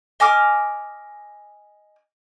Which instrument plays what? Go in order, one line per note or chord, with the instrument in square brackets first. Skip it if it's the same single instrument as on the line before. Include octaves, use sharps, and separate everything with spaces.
[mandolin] D#5 G#5 D6 F6